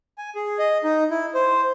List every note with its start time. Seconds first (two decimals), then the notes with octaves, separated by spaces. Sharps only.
0.18 G#5
0.35 G#4
0.59 D#5
0.84 D#4
1.11 E4
1.34 C5